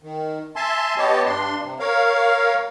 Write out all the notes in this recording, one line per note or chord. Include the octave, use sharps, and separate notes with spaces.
D#3
E5 G#5 A5 C6
B3 G4 C#5 D#5 A5
G2 D4 C6
C3
A#4 C#5 F5